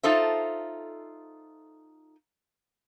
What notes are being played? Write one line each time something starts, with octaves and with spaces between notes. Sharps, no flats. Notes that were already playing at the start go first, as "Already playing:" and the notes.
D#4 F4 A4 C5 E5